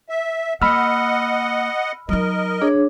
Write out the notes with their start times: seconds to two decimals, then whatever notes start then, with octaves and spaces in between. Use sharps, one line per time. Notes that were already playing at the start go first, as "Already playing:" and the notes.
0.09 E5
0.62 A#3 D#5 F#5 B5 E6 F6
2.09 F#3 D#4 A#4 D#5
2.62 D4 G#4 C#5